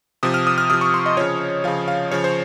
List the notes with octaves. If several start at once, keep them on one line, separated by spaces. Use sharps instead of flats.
C3 F3 D#6
F6
D#6
F6
C3 F3 D#6
C#6
C6
D#5
C#3 F3 C#5
C#3 F3 F5
F5
C#3 F3 C#5
C5